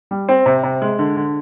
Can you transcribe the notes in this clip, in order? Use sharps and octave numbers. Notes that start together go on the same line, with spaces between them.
G3
C4
C3
C3
G#3
D3
D3